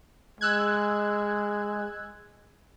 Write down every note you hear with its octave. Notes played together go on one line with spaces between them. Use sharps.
G#3 E6 F#6 G#6